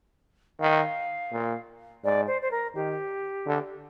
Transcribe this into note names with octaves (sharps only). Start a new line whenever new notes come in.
D#3 F5
A#2
G#2 D5
C5
C5
A#4
D#3 G4
D3